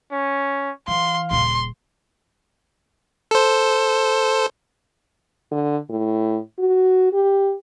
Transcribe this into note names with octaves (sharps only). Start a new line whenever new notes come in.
C#4
E3 F5 C6
D#1 C#3 C6
A4 C5
D3
A2
F#4
G4